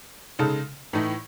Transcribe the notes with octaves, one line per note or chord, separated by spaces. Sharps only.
C#3 G#3 D#4 A4
A2 E3 A3 D#4